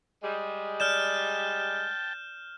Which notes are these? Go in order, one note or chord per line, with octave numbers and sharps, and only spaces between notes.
G3 G#3
D5 G5 A5 F6 G6 E7